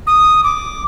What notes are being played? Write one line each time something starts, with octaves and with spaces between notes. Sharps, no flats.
D#6
D6